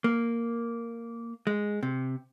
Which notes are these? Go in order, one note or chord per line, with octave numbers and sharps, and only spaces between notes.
A#3
G#3
C3